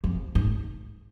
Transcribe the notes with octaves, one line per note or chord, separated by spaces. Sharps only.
F2
G#2